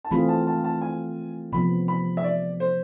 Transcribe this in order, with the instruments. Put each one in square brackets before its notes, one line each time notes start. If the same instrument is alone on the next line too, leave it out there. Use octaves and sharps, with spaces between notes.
[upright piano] A5
[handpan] E3 A3 C4 F4 G#4 [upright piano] B5
[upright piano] A5
A5
A5
G#5
[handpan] C3 F3 B3 [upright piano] B5
[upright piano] B5
E5
D5
C5